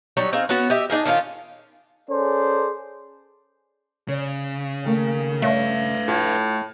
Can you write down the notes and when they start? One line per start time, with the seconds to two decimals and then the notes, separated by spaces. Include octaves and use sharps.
0.17 F#3 G3 D#4 C#5
0.33 C4 D#4 G#4 F5
0.49 B3 C#4 F#4
0.70 G4 D#5 E5
0.90 D4 D#4 G#4 A#4
1.05 D#3 C#4 D#4 F4
2.10 C#4 G#4 A4 C5 D5
4.08 C#3 C#5
4.84 D#3 A3 A#3
5.42 G2 C#3 A3 B4 E5 F5
6.08 A2 F4